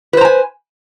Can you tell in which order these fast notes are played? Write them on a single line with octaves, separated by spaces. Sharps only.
B4 C5 A#5 G#5